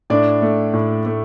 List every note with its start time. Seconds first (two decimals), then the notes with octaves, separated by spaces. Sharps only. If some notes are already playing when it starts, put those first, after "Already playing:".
0.10 A2 D4 D5
0.42 A3
0.73 A2
1.06 A3